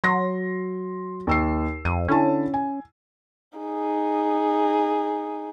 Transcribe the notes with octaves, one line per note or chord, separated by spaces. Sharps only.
F#3 C6 A#6
D#2 E6 C7
F2 D#7
D3 C#4 E4 A5
G#5
D#4 G#4